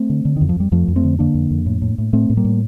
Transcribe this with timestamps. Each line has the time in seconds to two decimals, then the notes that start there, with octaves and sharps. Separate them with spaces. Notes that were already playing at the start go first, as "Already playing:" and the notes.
Already playing: A3 C4
0.10 D3
0.25 D3
0.36 F2 D#3
0.49 F3
0.56 F2 G3
0.72 F2 F3 A3
0.88 F2
0.96 A3 C4
1.04 D3
1.19 D3 A#3 D4
1.34 F2
1.51 F2
1.66 A2
1.82 A2
1.98 A2
2.13 A2 A3 C4
2.30 A2
2.37 G3 A#3
2.45 A2